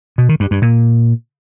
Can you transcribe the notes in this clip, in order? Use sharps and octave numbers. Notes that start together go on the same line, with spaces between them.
B2
D#3
G2
G2
A#2